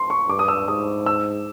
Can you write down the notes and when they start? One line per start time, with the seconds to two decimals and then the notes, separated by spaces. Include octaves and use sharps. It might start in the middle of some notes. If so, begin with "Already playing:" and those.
Already playing: C6
0.10 C#6
0.28 G2 D6
0.39 D#6
0.48 E6
0.68 G#2 D#6
1.06 E6